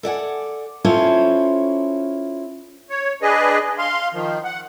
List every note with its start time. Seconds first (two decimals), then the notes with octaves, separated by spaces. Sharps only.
0.03 A4 D5 F#5 G#5
0.85 C#4 E4 F4 A4 C5 C#5
2.90 C#5
3.22 D4 G#4 B4 D#5
3.78 F5 C6
4.13 D#3 F3
4.45 F#5